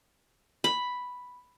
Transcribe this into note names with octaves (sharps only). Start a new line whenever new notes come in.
B5